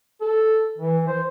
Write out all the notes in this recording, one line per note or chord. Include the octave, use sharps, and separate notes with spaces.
A4
E3
C5